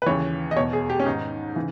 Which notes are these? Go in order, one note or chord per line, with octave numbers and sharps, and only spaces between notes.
B4
D#2 C#3 E3 C#5
D#5
E2 B2 C#5
G#4
G4
C#4
G#2 D#3 D#4
C#3 E3